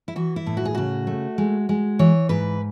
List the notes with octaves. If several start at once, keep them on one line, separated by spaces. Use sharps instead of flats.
E4
E3 F#4
E4
A2
F#4
G#4
C#3 F#4
A3
G#3
G#3
E3 C#5
G#2 B4